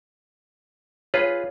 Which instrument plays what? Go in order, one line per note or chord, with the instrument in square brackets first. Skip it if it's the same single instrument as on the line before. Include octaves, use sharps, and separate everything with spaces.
[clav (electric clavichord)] F4 G#4 B4 [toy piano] C#5